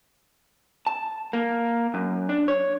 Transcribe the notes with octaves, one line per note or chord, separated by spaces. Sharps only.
A5
A#3
F#2
D4
C#5